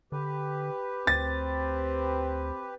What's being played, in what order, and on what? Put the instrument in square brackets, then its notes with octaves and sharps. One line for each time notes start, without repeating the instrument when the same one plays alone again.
[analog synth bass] D3 [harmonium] G4 B4
[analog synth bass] D2 [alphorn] C4 [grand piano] A6